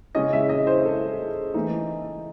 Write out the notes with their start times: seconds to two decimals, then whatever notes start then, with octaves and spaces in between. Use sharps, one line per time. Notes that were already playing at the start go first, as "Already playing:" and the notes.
0.15 C#3 G#3 C#4 D#5
0.33 E5
0.49 D#5
0.67 C5
0.85 A4
1.54 E3 A3 D#4